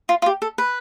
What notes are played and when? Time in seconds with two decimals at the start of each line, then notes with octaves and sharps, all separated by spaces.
0.09 F4
0.22 F4
0.26 G4
0.42 A4
0.58 B4